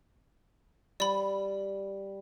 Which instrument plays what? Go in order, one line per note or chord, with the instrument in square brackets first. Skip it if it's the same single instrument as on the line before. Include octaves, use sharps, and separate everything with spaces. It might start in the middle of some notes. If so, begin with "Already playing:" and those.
[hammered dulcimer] G3 [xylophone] D5 B5